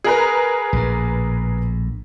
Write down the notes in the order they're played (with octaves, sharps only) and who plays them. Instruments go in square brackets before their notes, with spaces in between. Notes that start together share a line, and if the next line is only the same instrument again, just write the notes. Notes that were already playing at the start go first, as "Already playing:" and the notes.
[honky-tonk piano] G#4 A#4 B4
[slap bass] A#1 A2